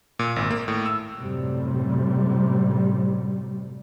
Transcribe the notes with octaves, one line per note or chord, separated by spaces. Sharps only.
A#2
G#1
A#3
A2
E6
F#2 A2 C3 G3